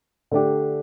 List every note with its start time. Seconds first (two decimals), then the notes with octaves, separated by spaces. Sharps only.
0.31 D3 A3 D4 G4